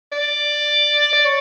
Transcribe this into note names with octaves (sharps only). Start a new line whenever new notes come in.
D5
D5
C#5